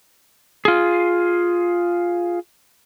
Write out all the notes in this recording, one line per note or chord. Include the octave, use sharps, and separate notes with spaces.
F4 G#4